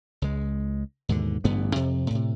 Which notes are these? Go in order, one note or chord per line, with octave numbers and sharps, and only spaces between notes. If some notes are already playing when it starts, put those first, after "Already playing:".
C#2 G#3
D#2 G#2 B2 D3
A1 G2 D3 B3
F2 C3
A2 C3